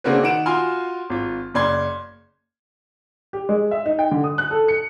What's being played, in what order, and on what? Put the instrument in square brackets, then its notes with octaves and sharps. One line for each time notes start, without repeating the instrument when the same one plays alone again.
[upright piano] C#3 A#3 C4 D4 F#4 B4
D#3 F#5 D7 E7
F4 F#4 G#5 C6 F6
G#1 F4
F#1 D5 C6 G#6
G4
G#3
E5
D#4
G5
D3
D#6
F#6
A4
C#7